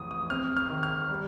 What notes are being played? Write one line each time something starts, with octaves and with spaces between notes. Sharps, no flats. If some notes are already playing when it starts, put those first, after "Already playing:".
Already playing: A1 F2 E3 D#6
D#6
C4 F6
F6
D#3
F6
G3